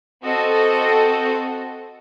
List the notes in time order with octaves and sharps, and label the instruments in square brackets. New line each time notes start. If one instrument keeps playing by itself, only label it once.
[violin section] C4 F#4 A4 D#5